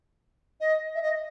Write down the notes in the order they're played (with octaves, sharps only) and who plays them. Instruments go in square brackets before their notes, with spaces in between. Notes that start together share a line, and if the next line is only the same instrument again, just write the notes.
[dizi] D#5
E5
D#5